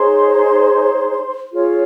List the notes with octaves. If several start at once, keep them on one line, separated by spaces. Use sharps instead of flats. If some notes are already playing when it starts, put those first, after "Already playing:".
Already playing: D#4 G#4 C5 C#5 C6
F4 G#4 C#5